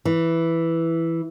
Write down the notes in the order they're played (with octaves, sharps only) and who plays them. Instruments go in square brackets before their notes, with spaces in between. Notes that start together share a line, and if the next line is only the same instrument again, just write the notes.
[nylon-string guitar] E3